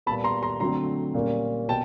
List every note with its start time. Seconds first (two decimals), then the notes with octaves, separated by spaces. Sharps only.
0.06 A#2 G3 B3 A5 B5
0.24 A#5 C6
0.43 A#5 C6
0.60 D3 F#3 A3 C4 A#5 C6
1.14 A#2 G3 A#3 C#4
1.68 B2 G5 A5